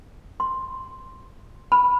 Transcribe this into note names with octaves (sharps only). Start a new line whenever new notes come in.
C6
B5